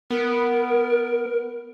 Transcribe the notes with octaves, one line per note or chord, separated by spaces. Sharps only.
B3 A#4